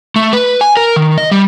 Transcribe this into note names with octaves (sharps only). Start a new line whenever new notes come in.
A3
B4
G#5
A#4
D#3
D#5
G3